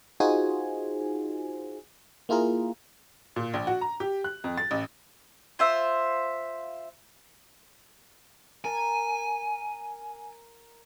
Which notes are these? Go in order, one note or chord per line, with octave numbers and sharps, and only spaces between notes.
D#4 F4 F#4 G#4 C5 G#5
A#3 E4 F4 G#4 A#4
A#2
A#1
F#4
A#5
G4
F#6
F2
A6
A1
F4 C5 E5
A#4 G#5 A5